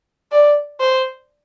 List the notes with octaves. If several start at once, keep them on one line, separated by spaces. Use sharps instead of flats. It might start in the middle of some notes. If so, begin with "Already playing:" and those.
D5
C5